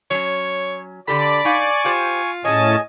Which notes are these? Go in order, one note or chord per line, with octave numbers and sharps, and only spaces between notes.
F#3 C#4 C#5
D3 G4 A4 D5 B5
D#4 F5 G#5 C#6
F4 G4 C5
A2 C#4 G#4 C#5 D#5 G#5 A5